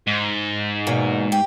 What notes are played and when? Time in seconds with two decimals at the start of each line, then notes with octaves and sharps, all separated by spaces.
0.07 G#2
0.87 E2 B2 A#3
1.32 G4